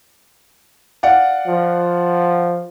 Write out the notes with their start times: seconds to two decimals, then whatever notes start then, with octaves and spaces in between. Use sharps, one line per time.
1.03 D5 F5 F#5
1.47 F3